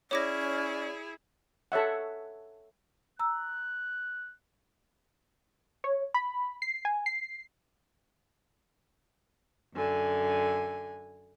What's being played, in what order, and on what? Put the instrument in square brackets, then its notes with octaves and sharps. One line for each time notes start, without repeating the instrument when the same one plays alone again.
[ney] C#4 [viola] E4 G#4 [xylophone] C#5 D6 A#6 [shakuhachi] D5
[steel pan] A4 C#5 E5 F#5
[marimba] A#5 E6 [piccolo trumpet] F#6
[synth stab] C#5
B5
C7
G#5
C7
[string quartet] F#2 D3 G#5